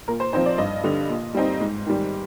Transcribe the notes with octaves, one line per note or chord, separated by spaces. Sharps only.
A#2 A#4
C5
F3 C4 D#4 C5
D5
G2 D#5
D3 G3
A#2
G3 C4 D#4
G#2
D#3 G3